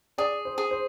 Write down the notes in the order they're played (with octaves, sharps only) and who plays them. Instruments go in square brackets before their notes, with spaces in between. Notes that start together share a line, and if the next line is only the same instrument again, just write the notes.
[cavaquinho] G#4 [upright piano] D5
[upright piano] C5
[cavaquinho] G#4
[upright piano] C5